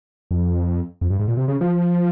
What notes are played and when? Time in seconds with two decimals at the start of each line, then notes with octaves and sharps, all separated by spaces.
0.31 F2
1.01 F2
1.10 G2
1.19 G#2
1.28 A#2
1.37 C3
1.48 C#3
1.61 F3